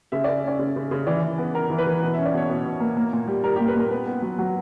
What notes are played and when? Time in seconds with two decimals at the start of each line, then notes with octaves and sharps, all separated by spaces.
0.12 C#3 E5
0.24 C#3 D5
0.44 C#4 D5
0.59 C#3
0.76 C#3
0.91 C#3
1.07 E3 D5
1.23 E3
1.38 B3
1.54 B3 A#4
1.70 E3
1.78 B4
1.87 E3
2.02 B2
2.14 C#4 E5
2.26 D5
2.34 B2 C#5
2.50 B2
2.66 B2
2.80 A#3
2.97 A#3
3.13 A#2
3.28 G3
3.44 G3 A#4
3.56 A#2 G4
3.68 B4
3.75 A#2 A#4
3.91 B3 B4
4.07 B3
4.22 F#3
4.39 F#3